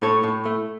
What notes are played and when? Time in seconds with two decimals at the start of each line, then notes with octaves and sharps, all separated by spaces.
0.02 A2 A4 C#5
0.23 A2
0.45 A3